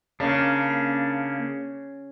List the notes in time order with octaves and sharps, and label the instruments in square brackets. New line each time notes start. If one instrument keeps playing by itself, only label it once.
[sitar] C#3 [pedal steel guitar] A#3 D4